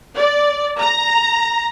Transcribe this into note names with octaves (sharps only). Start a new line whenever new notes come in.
D5
A#5